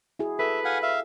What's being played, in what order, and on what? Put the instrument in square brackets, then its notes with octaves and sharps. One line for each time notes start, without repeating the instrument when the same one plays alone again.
[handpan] E4 F#4 G#4
[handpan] A4 [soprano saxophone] B4 [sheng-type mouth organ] E5
[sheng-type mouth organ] F5 F#5 G#5
E5 F5